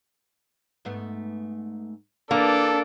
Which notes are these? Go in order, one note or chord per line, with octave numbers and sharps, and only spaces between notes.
G#2 A3 B3
E3 A#3 D4 E4 A4 B4